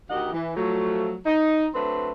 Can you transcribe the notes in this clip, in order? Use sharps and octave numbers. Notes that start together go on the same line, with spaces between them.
D2 D#3 D#4 G4 D#5 F#5
E3
F3 F#3 A3
D#4
F#3 A3 C4 D4 B4